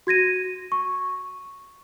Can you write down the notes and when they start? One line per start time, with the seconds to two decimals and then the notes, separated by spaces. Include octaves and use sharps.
0.07 F#4 G#6 A#6 D#7
0.72 C#6